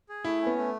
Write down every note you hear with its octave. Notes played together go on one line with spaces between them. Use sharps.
G#4
A3 E4
C#4
B3
A3